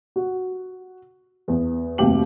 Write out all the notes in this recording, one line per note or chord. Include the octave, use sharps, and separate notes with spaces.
F#4
E2
F1 D#2 C3 F#3 G4 F#7